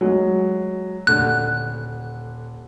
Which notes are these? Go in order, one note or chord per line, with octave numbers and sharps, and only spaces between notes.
F#3 G#3 G#4
D#1 D3 F#6